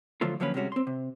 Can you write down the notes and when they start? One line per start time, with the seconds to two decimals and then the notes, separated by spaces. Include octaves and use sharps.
0.21 D3 F3 F#3 A3 F4
0.40 D3 F3 F#3 A#3 C#4 B4
0.54 C3 G3 G#3 C#4 F#4
0.72 C4 C6
0.87 C3